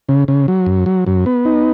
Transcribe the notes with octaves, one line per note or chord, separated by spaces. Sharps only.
C#3
C#3
F#3
F#2
F#3
F#2
B3
D#4